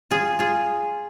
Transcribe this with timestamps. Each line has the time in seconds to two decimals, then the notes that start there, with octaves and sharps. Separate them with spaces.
0.11 F4 G#4
0.39 F4 G#4